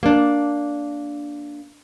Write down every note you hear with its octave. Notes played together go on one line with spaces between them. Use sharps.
A#3 D4